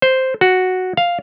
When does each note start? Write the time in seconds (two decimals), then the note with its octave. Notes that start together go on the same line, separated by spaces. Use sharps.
0.02 C5
0.41 F#4
0.97 F5